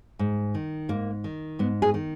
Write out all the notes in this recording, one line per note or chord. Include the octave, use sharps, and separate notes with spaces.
G#2
D#3
G#2 A#3
D#3
G#2 B3
G#4
D#3